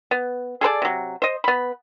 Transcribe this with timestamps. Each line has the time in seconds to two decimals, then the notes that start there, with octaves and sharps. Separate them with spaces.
0.11 B3
0.61 G#4 A4 B4 D5
0.82 C3 F#3
1.22 C5 D#5
1.44 B3 B5